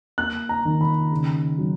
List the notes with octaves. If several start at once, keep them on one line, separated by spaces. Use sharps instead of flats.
A#3 F#6
A#5
D#3
B5
C#3
F#3